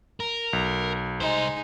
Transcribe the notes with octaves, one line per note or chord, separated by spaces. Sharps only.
A#4
B1
C2 G#3 D#4 C5